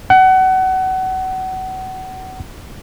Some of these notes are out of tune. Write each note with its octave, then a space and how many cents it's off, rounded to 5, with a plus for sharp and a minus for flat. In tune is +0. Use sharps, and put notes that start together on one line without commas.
F#5 +30